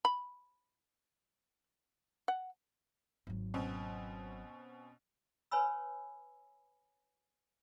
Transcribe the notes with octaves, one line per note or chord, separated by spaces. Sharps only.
B5
F#5
G#1 F#3
B2 C4 C#4
B4 C#5 G#5 B5 E6